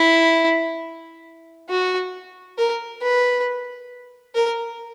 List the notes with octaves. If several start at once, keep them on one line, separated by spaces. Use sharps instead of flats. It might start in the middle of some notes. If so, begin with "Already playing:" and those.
Already playing: E4
F#4
A#4
B4
A#4